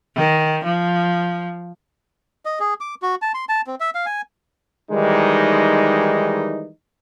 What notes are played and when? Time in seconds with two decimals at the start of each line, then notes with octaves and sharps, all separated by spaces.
0.16 D#3
0.65 F3
2.45 D#5
2.60 G#4
2.80 D6
3.02 F#4
3.22 A5
3.34 C6
3.49 A5
3.67 C4
3.80 E5
3.95 F5
4.06 G#5
4.90 D#3 E3 G3 G#3 D#4